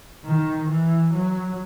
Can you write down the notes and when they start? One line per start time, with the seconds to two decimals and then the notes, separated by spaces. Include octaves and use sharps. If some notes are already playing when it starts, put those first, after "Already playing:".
0.25 D#3
0.69 E3
1.14 F#3